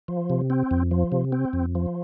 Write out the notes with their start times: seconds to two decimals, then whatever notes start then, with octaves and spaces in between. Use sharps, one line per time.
0.08 F3
0.30 C3
0.50 C4
0.71 F2
0.91 F3
1.12 C3
1.32 C4
1.53 F2
1.75 F3